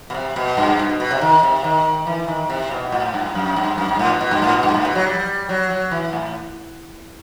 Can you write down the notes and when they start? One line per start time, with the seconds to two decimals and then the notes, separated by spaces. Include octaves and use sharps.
0.10 B2
0.14 C3
0.36 B2
0.57 G2
0.79 B2
0.89 B2
1.00 B2
1.11 C3
1.21 D#3
1.43 C3
1.64 D#3
2.07 E3
2.28 D#3
2.50 C3
2.71 B2
2.92 A2
3.14 G2
3.35 F#2
3.56 G2
3.78 F#2
3.88 G2
3.99 A2
4.10 B2
4.21 B2
4.31 G2
4.42 A2
4.53 B2
4.63 G2
4.74 A2
4.85 B2
4.95 F#3
5.06 G3
5.49 F#3
5.70 F#3
5.91 E3
6.13 A2